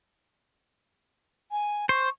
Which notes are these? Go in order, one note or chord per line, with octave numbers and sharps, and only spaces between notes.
G#5
C5 C#6